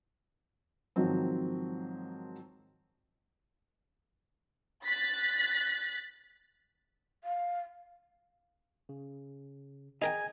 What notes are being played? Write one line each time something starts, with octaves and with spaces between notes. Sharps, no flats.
G#2 D#3 F3 F#3 C4
F#6 A6 B6
F5
C#3
D#4 G#4 A#4 D#5 G5 G#5